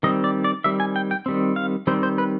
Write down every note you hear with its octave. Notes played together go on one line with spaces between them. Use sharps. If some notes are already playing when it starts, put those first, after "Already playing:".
D#3 G3 C4 D#5
D5
D5
D#3 G3 C4 E5
G#5
G5
G5
D#3 G3 C4
F5
D#3 G3 C4 C5
C5
B4